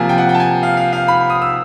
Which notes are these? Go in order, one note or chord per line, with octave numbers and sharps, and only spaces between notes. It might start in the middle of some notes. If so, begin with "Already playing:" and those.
Already playing: C3 F3 A#3 G#5
G5
F#5
G5
A5
G#5
F5
F5
F5
B5
D#6
E6